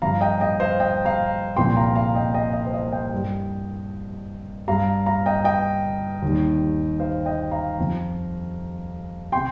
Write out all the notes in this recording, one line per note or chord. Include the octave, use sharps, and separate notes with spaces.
G2 F3 F5 A#5
D#5 G5
D#5 G5
C5 F5
D#5 G5
F5 A#5
C2 A#2 F3 G5 C6
F5 A#5
F5 A#5
D#5 G5
D#5 G5
D#5
C5
D#5
D#5 G5
G2 G3
G2 G3 F5 A#5
F5 A#5
D#5 G5
D#5 G5
D#2 D#3 G3
C5 F5
D#5 G5
F5 A#5
F2 F3
C3 G5 C6